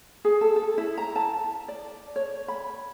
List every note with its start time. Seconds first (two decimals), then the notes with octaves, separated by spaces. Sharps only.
0.25 G#4
0.41 A4
0.56 A4
0.78 E4
0.97 A#5
1.16 A5
1.68 D5
2.16 C#5
2.48 B5